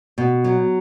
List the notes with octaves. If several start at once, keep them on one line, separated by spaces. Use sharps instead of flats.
B2
F#3